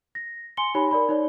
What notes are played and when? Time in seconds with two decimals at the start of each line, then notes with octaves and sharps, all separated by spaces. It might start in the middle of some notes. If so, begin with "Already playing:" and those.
0.15 A#6
0.57 G#5 C6 C#7 G7
0.75 D#4 G4 C#5 G#5 B5
0.91 A#4 D5 B5
1.09 D#4 C#5 D5